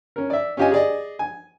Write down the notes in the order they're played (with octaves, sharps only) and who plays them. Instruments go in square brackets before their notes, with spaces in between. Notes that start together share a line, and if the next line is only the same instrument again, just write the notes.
[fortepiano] C#4 A#4
D5 E5
C#4 F4 G4 D#5 G#5
G#4 D5 D#5
G#5